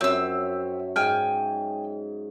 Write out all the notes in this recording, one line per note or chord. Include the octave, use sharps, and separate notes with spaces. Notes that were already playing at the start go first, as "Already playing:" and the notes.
F#2 C4 C#5 E5 E6
G#2 G5 G#5 F6